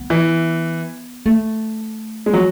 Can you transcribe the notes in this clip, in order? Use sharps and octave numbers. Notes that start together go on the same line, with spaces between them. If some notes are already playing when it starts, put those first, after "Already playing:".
Already playing: B3
E3
A3
G#3
F#3